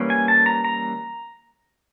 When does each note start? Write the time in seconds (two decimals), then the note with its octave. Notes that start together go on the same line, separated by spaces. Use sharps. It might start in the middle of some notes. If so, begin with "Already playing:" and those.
Already playing: E3 G3 A#3 C#4
0.10 G#5
0.28 A5
0.46 A#5
0.65 A#5